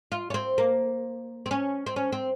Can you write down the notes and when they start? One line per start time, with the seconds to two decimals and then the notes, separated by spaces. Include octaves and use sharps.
0.12 F4
0.30 C#4
0.34 C4
0.58 A#3
1.46 C4
1.51 C#4
1.86 C4
1.96 C#4
2.12 C4